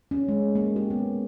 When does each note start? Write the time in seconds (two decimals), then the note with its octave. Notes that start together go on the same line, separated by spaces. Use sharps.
0.11 C#4
0.28 G#3
0.55 A#3
0.76 G4
0.90 B3